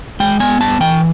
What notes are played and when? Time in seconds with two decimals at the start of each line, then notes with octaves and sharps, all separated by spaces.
0.20 G#3 G5
0.40 B3 G#5
0.60 G2 A5
0.80 E3 G5